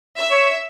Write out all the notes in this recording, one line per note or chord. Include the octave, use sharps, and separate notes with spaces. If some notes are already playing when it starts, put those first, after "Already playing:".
E5
C#5